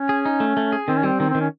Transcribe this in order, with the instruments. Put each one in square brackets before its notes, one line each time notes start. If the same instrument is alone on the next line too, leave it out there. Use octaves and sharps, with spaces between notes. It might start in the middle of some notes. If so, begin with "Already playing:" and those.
Already playing: [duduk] C#4
[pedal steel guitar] G#4
D#4
A3
A3
G#4
[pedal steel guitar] D#3 [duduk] C4
[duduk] C#4
[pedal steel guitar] G3 [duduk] C4
[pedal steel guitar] D#3 [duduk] C4
[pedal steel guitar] D#3 [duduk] C4
[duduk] C#4